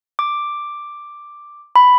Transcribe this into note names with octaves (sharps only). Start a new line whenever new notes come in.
D6
B5